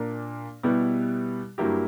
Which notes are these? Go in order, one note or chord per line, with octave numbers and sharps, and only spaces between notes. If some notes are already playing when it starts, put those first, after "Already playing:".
Already playing: A#2 A#3 D4 A#4
B2 G3 B3 E4 G4
G2 F#3 A#3 E4 G4